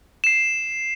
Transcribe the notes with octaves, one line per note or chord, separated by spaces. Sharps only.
C7 E7